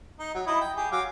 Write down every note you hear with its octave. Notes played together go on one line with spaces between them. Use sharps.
D#4
F#3
D#4 E4 D#5
G5
G4 G#4
F#3 F5 D6